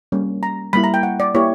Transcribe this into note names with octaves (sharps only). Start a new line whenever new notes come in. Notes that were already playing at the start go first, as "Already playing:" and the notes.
G3 A#3 C#4
A#5
G3 A#3 E4 B5
A#5
G5
F#5
D5
A#3 E4 G4 C#5